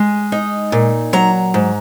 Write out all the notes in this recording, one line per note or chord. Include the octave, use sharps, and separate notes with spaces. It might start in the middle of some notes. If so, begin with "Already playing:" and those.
Already playing: G#3 G#5
D#4
A#2
F#3 A#5
G#2